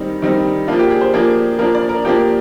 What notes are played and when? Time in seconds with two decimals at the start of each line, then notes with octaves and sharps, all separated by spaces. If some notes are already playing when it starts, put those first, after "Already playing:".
Already playing: D#3 G3 C4 D#4
0.22 D#3 G3 C4 D#4
0.68 F3 A#3 D4 F4
0.79 G4
0.91 G#4
1.01 C5
1.14 F3 A#3 D4 G#4
1.59 F3 A#3 D4 A#4
1.75 D5
1.89 A#4
2.05 F3 A#3 D4 G4